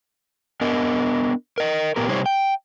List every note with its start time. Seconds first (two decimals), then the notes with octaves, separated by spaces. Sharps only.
0.61 B3 D4 A#4 D#5
1.58 A#4 D#5
1.96 A#2 B3 G4 A#4
2.09 C3 G3 D#4 G4 C5 C#5
2.26 G5